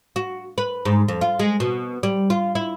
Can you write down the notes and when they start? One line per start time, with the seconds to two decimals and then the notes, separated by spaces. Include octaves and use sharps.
0.16 F#4
0.58 B4
0.85 G#2
1.08 F2
1.21 F4
1.39 G#3
1.60 B2
2.03 G3
2.30 F4
2.55 E4